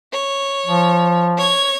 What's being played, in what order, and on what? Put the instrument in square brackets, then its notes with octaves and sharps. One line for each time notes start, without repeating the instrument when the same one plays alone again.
[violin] C#5
[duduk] F3
[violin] C#5 G#6